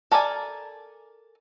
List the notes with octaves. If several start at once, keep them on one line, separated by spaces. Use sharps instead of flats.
A4 A#4 D5 E5 G#5